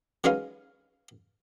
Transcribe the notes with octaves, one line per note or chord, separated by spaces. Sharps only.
F#3 G#3 C#4 D#4 B4 F5